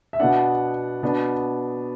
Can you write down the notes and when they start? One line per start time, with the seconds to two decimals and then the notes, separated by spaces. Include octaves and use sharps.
0.13 E5
0.20 B2 B3 D4 F#5
1.03 B2 B3 D4